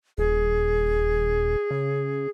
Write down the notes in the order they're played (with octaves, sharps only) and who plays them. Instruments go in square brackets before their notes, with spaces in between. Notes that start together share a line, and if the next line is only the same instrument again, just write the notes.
[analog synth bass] D#1 [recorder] G#4
[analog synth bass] C#3